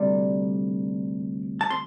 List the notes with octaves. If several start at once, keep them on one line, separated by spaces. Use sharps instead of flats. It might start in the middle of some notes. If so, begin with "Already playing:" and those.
Already playing: D2 C3 G3 D5
A5
C6